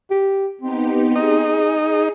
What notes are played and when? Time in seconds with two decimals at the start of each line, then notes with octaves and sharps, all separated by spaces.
0.11 G4
0.61 B3 C4 D#4 G4
1.16 D#4 G#4